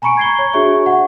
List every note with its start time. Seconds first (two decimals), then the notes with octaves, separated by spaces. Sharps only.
0.02 G#5 A#5 B5 C#6 C#7 D7
0.17 G#6 C7 G7
0.39 C#5
0.53 D4 F#4 G#4 C#5 E5 C#6
0.86 F#5